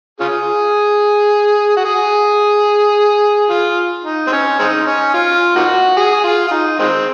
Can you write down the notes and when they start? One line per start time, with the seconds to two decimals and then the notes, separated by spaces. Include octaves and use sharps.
0.20 C#4 F4 G#4
1.77 F#4
1.85 G#4
3.50 F4
4.05 D#4
4.27 C4
4.32 C#4
4.59 G#3 C4 D#4
4.87 C#4
5.14 F4
5.56 A#3 D#4 F#4
5.97 G#4
6.24 F4
6.48 F4
6.52 D#4
6.79 D#3 G#3 C4